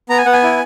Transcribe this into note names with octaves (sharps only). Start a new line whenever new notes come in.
B3 A#5
G#5
B3 F#5
G#5
E4